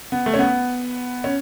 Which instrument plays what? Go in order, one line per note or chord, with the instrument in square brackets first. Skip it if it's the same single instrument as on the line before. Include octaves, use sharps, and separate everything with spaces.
[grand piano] B3
A3
C#4
B3
C#4